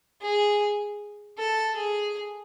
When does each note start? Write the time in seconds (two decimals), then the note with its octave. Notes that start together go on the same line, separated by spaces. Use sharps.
0.22 G#4
1.38 A4
1.76 G#4